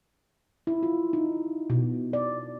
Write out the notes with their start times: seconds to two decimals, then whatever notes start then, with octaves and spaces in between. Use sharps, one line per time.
0.67 E4
0.83 F4
1.13 D#4
1.70 B2
2.13 D5